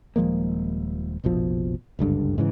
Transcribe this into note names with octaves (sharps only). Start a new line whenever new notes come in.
D#1 F3 G#3 A#3
F1 A#1 B2 F3
F#1 C#2 G2 D3
G#2 C#3 E3